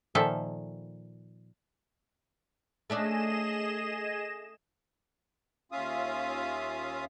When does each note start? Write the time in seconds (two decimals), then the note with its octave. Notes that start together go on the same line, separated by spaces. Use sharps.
0.15 A#2 D#3 F3 A4 E5
2.90 A3 C#4 D4 G#4 D#5 E7
5.72 D#2 C#4 F4 E5 F5 D#6